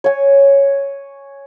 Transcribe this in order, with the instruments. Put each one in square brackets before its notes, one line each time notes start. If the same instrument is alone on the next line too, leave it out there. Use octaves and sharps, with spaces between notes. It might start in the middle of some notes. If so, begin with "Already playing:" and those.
[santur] C#5 G#5